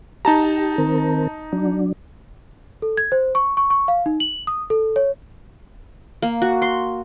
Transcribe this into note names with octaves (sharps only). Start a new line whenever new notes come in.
D#4 G4 A5 A#5
D#3 C4 A#4
F#3 D4
A4
G#6
C5
C#6
C#6
C#6
F5
D#4
F#7
D#6
A4
C#5
A#3
F#4
C6